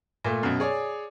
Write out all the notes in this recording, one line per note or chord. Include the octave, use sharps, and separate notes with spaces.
A#2 A3
F#2 B2
G#4 C#5 D5